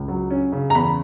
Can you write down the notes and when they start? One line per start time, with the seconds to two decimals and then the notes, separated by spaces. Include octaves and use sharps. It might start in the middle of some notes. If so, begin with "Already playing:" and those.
Already playing: C#2
0.08 F#3
0.30 C#4
0.52 C#3
0.70 A#5
0.75 E2 B5